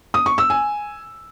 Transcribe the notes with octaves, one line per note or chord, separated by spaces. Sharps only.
D#6
C#6
E6
G#5